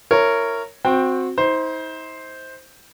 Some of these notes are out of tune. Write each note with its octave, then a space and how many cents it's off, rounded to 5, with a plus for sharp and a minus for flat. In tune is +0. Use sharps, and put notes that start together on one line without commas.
E4 +5 A#4 -15 C#5 +0
C4 +0 F#4 -20 G5 +0
D#4 +45 C5 +0